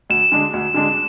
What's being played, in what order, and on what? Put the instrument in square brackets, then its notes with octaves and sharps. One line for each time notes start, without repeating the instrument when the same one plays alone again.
[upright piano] D2 [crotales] E7
[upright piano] D3 G#3 D4
D2
D3 G#3 D4